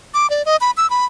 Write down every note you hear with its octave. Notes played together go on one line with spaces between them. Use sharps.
D6
D5
D#5
B5
E6
B5